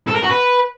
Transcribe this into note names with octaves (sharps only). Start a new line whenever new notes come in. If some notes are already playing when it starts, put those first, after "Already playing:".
A4
A#4
F#4
B4